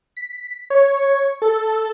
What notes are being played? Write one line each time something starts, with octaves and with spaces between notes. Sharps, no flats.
B6
C#5
A4